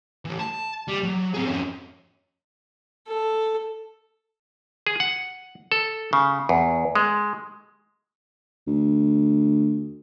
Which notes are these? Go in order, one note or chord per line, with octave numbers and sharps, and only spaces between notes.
E3 A3
A5
G3
F#3
C4 G#4
F2 C#4
A4
G#4
F#5
A4
C#3
E2
G#3
D2